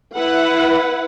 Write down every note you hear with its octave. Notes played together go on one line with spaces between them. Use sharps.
E4 B4 F#5